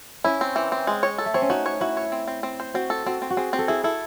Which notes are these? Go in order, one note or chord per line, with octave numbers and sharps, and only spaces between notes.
C#4 E4
C4
E3
C4
G#3
C#5
A4
A3
C4 C#5
C#4
D#4 F#4
C#5
E4 F#4
C#5
C4
C4
C4
C5
C4 F#4
A4
C4 F#4
C4
F#4
C4 G#4
C4
A4
E4 G#4
E4 A4